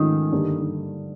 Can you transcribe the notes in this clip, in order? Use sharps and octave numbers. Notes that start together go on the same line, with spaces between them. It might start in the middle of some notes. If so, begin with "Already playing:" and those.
Already playing: G#2 D#3 F3 A3 C#4 F4
G2 D3 G3 A#3 D#4